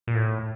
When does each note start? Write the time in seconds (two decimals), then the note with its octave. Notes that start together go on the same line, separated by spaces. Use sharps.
0.07 A#2
0.15 A2